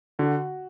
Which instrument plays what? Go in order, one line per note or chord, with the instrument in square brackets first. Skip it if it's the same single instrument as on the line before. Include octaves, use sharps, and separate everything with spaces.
[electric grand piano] D3 [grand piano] F#4